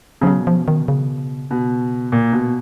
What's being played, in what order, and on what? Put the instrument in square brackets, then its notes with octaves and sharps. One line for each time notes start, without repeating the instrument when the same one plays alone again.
[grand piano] C#3 [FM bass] F3
[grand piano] B2 [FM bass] F#3
[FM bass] F3
D#3
C#3
[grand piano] B2
A#2
B2